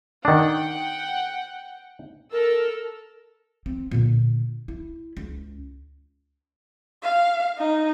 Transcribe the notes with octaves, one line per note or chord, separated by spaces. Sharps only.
D#3 D4 F#5 G5
A4 A#4 E6
C4
A#2 D3
E4
C#2
F5
D#4